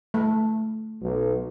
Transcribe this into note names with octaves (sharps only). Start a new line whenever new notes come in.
A3
B1